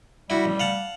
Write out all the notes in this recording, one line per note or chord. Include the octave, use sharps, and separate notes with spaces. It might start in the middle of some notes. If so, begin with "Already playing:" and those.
G3 E4 F#4
A1
F5 F#5 A5